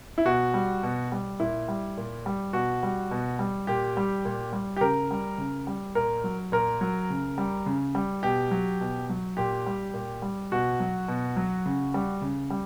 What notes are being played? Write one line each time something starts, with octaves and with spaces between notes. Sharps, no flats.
E4
B2 F#4
G3
B2
G3
A#2 E4
G3
A#2
G3
B2 F#4
G3
B2
G3
A#2 G4
G3
A#2
G3
G4
C#3 A#4
G3
C#3
G3
A#2 A#4
F#3
A#2 A#4
F#3
C#3
G3
C#3
G3
B2 G4
F#3
B2
F#3
A#2 G4
G3
A#2
G3
B2 F#4
F#3
B2
F#3
C#3
G3
C#3
G3